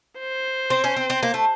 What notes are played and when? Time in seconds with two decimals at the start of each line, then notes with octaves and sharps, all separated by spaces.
0.19 C5
0.70 C4
0.84 C#4
0.96 C4
1.10 C4
1.23 A#3
1.34 A3